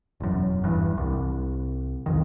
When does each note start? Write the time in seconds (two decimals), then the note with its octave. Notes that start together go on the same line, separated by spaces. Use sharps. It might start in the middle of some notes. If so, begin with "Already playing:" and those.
0.20 E1 F#2
0.64 E2 G2
0.98 C2
2.06 C2 F2 D#3